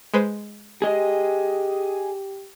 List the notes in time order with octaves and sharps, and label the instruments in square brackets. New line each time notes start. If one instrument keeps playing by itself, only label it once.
[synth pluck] G#3 B4 C5
[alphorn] G4 [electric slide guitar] G#4 D#5